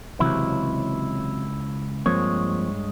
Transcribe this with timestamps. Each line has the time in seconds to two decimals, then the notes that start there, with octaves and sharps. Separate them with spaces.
0.20 C#2 C3 E3 F#3 E4
2.06 G2 F3 G#3 A#3 C4 C#5